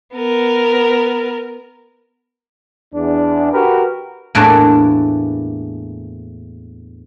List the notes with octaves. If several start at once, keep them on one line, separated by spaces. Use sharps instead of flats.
B3 A#4
E2 D4
F#4 G4 A#4 B4
E2 A2 E3 A#3 D4